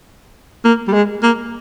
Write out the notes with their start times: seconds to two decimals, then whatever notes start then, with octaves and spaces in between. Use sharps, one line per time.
0.65 A#3
0.88 G3
0.93 G#3
1.23 A#3